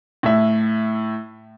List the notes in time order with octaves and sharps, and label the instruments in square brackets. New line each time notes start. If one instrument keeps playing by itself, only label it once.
[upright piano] A2 E5